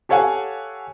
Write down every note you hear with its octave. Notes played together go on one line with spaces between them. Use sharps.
G4 A4 C#5 F5 F#5 G#5